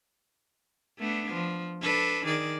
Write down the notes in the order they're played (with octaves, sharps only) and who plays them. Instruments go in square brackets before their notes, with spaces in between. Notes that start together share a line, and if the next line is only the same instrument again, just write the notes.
[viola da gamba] A3 B3 D4
F3
D4 A4 B4
D#3 G#4 D5